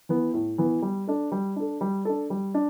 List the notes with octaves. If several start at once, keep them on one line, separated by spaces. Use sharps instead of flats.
E3 B3
A2
E3 B3
G3
D4 A4
G3
D4 A4
G3
D4 A4
G3
D4